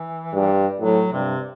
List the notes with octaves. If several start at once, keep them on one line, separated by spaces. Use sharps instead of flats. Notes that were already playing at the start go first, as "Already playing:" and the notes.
Already playing: E3
G2
A2 F#3
G2 C3